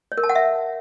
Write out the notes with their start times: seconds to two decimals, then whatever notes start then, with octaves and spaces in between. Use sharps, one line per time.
0.12 C#5
0.18 A#4
0.23 A5
0.29 F#5
0.35 E5